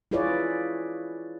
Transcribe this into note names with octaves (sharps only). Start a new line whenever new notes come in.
E4 F4 G#4 B4 C#5 D5